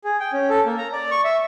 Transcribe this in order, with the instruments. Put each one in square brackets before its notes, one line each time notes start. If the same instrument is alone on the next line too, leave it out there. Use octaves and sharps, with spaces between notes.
[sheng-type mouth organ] G#4
G5
C#4
A4
A#3
A#5
D5
C#6
E5